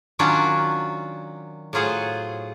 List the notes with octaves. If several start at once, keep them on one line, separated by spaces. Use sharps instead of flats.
D#3 F#3 C#4 D4 F4 F#4
A2 F#3 F4 G#4 C5 F#5